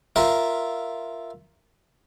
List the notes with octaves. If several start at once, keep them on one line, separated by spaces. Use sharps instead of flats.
F4 A#4 E5